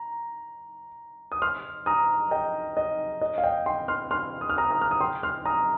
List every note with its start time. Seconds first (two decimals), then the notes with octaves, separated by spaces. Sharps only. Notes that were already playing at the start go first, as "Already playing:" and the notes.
Already playing: A#5
1.32 D#6
1.42 C6 F6
1.86 A#5 D#6
2.31 D#5 G5
2.77 D#5
3.21 D#5
3.38 F5
3.43 D#5 G5
3.66 G5 C6
3.88 C6 F6
4.11 C6 F6
4.41 D#6
4.49 F6
4.58 A#5 D#6
4.71 A#5 D#6
4.81 F6
4.91 D#6
5.00 G5 C6
5.23 C6 F6
5.45 A#5 D#6